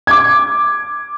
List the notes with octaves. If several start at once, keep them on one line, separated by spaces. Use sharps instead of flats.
D6 G#6